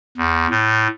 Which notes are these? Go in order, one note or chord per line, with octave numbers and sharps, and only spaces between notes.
E2
A2